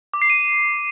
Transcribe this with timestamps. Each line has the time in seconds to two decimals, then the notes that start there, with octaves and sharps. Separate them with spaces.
0.14 D6
0.22 C7
0.30 D#7